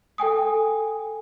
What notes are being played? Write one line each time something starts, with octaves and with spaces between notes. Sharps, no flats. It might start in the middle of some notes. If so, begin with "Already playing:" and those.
A4 G5 G#5 D#6